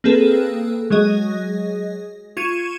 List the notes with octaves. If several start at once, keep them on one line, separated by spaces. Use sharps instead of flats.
A#3 C4 G#4 A4 B4
F#3 G#3 G#4 D#5
F4 C#6 G#6 C#7 D#7 E7